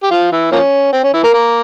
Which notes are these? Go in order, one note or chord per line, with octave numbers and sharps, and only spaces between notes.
G4
F3 F4
E3 E4
F3 A#3 C#4
C4
C#4
E3 E4
A#3 A#4
A#3 A#4